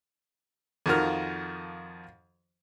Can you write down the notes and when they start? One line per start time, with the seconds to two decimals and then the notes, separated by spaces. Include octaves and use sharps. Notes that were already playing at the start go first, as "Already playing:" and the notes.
0.86 F2 D#3 F3 F#4 A#4 F6